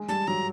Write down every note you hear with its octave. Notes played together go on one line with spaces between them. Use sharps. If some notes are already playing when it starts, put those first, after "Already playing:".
Already playing: G#3
G3 A5
F#3 A#5